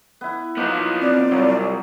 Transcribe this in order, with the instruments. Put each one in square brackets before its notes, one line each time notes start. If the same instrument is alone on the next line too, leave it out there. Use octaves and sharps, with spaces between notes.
[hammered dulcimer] B3 E4
[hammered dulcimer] F3 A#3 [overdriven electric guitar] B3 D#4
[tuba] C4 [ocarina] D5
[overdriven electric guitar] C2 [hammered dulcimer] F#3